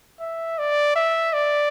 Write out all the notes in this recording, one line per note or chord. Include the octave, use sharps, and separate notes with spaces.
E5
D5
E5
D5